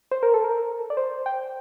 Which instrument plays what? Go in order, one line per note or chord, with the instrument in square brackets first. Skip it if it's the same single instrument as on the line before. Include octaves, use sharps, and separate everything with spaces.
[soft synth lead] C5
A#4
A4
A#4
D5
C5
G5